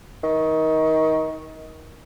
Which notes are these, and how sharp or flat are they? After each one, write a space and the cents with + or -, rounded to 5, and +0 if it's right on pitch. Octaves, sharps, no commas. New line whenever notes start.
D#3 +25